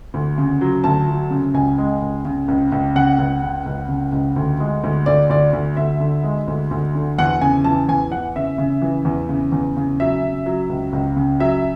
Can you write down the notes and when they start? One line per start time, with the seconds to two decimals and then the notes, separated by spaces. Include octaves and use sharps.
0.14 D2
0.38 C#3
0.61 F#3
0.84 D2 A5
1.08 F#3
1.31 C#3
1.54 C#2 G#5
1.78 G#3
2.02 C#2
2.25 C#3
2.48 C#2
2.72 C#2
2.95 C#3 F#5
3.18 C#2
3.43 C#3
3.66 C#2
3.89 C#3
4.12 C#2
4.36 D2
4.60 G#3
4.84 D2
5.06 D2 D5
5.30 D2 D5
5.53 D2
5.77 D2 E5
6.00 D3
6.23 G#3
6.48 D2
6.71 D2
6.95 D3
7.18 E2 F#5
7.41 C#3 G#5
7.64 E3 A5
7.88 E2 G#5
8.12 E3 F#5
8.36 C#3 E5
8.58 C#3
8.82 E3
9.05 E2
9.29 C#3
9.52 E2
9.77 C#3
10.00 F#3 E5
10.23 C#3
10.46 F#3
10.70 C#2
10.93 C#2
11.16 C#3
11.40 F#3 E5